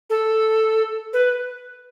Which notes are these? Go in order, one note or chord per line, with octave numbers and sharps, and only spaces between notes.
A4
B4